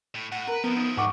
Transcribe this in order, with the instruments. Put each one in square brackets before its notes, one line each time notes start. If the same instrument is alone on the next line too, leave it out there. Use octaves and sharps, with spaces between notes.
[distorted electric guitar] A2
[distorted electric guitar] A2 [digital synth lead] F#5
[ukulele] A#4 [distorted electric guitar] B4
[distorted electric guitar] F3 E4 [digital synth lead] B3 [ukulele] A#4
[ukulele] D#4
[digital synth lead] G#2 [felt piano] F#5 C#6 D6